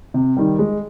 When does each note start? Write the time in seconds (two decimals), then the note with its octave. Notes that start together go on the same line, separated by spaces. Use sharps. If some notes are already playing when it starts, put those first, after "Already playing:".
0.14 C3
0.37 D#3 G3
0.59 G#3